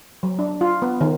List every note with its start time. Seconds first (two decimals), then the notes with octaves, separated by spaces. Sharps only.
0.23 F#3
0.39 D4
0.61 F4
0.82 B3
1.01 D#3